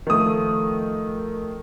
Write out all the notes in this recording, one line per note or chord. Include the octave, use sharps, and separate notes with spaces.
D#3 F3 A3 D#6